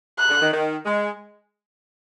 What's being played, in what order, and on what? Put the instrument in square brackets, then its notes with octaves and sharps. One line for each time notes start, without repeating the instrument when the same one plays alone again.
[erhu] F#6
[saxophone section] D3
D#3
D#3
G#3